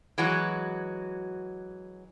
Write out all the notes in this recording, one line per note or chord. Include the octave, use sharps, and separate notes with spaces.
E3 F#3 G#3 F#4